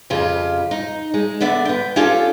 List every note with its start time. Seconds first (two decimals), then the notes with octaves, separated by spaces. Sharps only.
0.10 F2 C#3 F4 G4
0.71 D#4
1.14 G#3
1.41 D3 B3 D5 E5
1.65 B3 G5
1.96 C#4 D4 F4 G4 A4